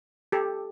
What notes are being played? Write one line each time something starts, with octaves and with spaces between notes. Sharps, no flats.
G4 A4